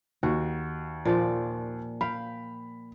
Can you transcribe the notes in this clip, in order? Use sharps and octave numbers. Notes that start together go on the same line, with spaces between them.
D#2 F#4
A#2 F3 D5
F5 G5 B5